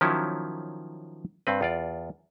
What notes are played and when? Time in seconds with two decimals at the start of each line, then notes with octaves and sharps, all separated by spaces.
0.01 D#3 F3 F#3 C#4 E4
1.47 G2 C4 B4
1.61 E2 F4 D5